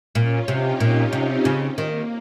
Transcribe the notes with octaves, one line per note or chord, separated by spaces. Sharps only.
A#2 C#4 F4
C3 D#4 G4
A#2 C#4 F4
C3 C4 D#4
C#3
D#3 A#3